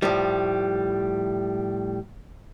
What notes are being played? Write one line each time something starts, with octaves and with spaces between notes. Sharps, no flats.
A2 F3 G3